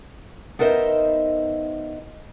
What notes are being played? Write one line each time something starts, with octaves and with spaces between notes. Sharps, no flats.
B3 D#4 A#4 C5 D#5 E5